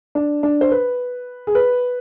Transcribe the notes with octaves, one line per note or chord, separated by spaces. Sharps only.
D4
D4
C5
B4
G#4
B4